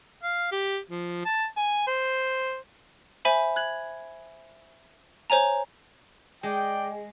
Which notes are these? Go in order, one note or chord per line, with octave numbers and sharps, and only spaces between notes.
F5
G4
F3
A5
G#5
C5
C5 E5 G#5 B5
F#6 G#6 F#7
C5 C#5 G#5 A#5
G#3 D5 G5